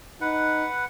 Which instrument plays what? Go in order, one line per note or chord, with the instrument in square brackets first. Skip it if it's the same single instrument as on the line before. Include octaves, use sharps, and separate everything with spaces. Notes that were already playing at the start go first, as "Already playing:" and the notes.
[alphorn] D#4 [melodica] B4 F#5